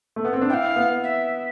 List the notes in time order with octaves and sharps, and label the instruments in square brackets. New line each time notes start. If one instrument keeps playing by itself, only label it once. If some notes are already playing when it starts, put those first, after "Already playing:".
[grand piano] A3
B3
C4
D4
[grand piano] E4 [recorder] F5 G5
[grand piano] B3
[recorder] E5